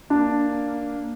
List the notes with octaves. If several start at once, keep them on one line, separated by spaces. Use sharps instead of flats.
A#3 D4